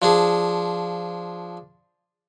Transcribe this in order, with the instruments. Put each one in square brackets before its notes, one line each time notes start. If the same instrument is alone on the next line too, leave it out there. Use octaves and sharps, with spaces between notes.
[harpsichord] F3 D4 G#4